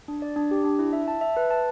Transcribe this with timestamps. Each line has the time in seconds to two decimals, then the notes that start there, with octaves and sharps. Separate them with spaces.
0.08 D4
0.22 D5
0.36 D4
0.51 G4
0.64 D4
0.79 E4
0.93 E5
1.08 A5
1.21 E5
1.37 B4
1.50 A5